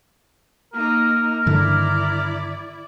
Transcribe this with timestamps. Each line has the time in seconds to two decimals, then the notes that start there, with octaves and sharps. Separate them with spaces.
0.74 A#3 D#4 A#4
1.46 G2 D3 D#3 E4 D5